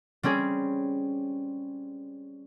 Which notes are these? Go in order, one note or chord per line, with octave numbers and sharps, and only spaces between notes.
G3 C4 C#4 G#4